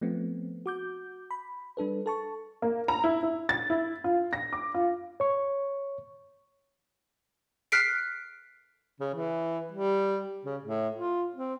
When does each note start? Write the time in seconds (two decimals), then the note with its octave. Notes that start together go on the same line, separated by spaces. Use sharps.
0.01 F3 A3 B3 C4
0.66 F#4 D6 G6
1.31 B5
1.77 G3 D4 A4 B4
2.06 A4 A5 C#6
2.62 A#3
2.88 A#5
3.04 E4
3.23 E4
3.49 A6
3.70 E4
4.04 F4
4.33 A#6
4.53 D6
4.74 F4
5.20 C#5 C#6
7.72 F6 F#6 B6 C7 D7
9.00 C#3
9.14 E3
9.72 G3
10.45 C#3
10.63 A2
10.95 F4
11.35 C4